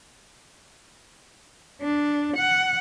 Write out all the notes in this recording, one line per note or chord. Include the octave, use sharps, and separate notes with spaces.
D4
F#5